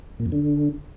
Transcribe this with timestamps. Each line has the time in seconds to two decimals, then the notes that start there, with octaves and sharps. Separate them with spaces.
0.20 A#2
0.26 F2
0.32 D3